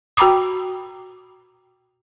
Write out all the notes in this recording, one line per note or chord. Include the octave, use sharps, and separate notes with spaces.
F#4 G5 A#5 B5 D6 D#6